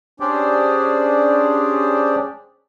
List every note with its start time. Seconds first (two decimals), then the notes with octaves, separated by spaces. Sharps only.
0.20 C#4 D4 G4 G#4 C5 D5